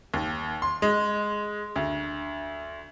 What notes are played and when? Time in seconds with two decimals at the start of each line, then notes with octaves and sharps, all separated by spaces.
0.14 D#2
0.62 C6
0.82 G#3
1.76 D2